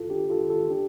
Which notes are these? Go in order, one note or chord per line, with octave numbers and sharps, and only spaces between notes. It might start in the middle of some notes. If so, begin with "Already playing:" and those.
Already playing: F4 A4
D4 G4
F4 A4
F4 A4
D4 G4